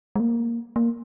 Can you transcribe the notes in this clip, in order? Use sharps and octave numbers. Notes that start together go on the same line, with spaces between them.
G#3
A#3
A#3